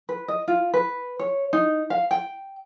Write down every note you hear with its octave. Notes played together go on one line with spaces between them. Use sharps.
B4
D#5
F4
B4
C#5
D#4
F5
G5